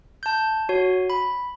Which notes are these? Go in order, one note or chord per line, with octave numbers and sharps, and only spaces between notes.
A5 G6
F#4 C#5
B5